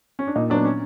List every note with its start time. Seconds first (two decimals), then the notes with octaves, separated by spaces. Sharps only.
0.19 C#4
0.27 D4
0.36 A#2 D#4
0.50 F#3 D4
0.55 B3
0.65 C#4